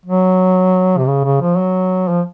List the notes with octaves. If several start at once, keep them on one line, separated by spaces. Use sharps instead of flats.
F#3
C3
C#3
C#3
F3
F#3
F3